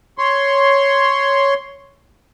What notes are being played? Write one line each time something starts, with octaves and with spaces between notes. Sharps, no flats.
C#5 C6